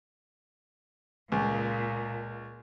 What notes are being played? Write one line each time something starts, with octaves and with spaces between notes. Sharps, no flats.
C#2 A#2